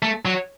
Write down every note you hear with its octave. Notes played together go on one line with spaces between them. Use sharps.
A3
F#3